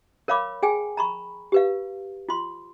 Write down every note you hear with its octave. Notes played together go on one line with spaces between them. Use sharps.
A#4 C#5 F5 B5 D6
G#4 G5 G#5
A#5 B5 C#6
G4 B4 F5
F4 C6